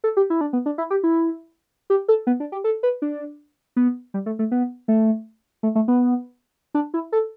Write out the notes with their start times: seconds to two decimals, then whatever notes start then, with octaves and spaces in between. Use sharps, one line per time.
0.04 A4
0.17 G4
0.30 E4
0.41 D4
0.53 B3
0.66 D4
0.78 E4
0.91 G4
1.04 E4
1.90 G4
2.08 A4
2.27 B3
2.40 D4
2.52 G4
2.64 A4
2.83 B4
3.02 D4
3.76 B3
4.14 G3
4.26 A3
4.39 A3
4.51 B3
4.88 A3
5.63 A3
5.75 A3
5.88 B3
6.74 D4
6.94 E4
7.12 A4